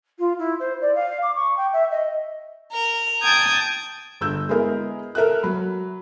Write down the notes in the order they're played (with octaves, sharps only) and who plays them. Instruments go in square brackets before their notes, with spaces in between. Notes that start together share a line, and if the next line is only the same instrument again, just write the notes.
[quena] F4
E4
C5
D5
F5
D6
C#6
G5
E5
D#5
[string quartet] A#4
G5 A5 D#6 G6 G#6
[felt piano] G1 E6 G6
G#3 B3 E4 G#4 A#4
A4 A#4 E5 F#6
F#3 B5